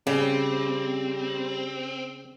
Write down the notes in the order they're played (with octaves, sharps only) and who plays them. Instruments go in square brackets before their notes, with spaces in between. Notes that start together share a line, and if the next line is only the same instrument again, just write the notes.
[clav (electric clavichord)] C#3 [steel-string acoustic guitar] G3 [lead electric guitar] C4